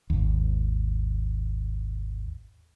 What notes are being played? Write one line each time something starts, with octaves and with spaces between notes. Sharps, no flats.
G#1 D#2